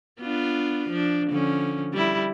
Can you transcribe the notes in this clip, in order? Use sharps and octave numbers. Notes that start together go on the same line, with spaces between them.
B3 D4 F4
F3 D4
D3 F3 C#4
G3 E4